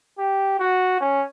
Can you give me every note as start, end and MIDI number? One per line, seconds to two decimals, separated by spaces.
0.18 0.55 67
0.59 0.99 66
1.00 1.24 61